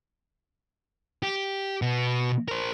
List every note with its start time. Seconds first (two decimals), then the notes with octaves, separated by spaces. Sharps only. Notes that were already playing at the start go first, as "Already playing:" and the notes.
1.23 G4
1.82 B2 B3
2.48 A#4 C5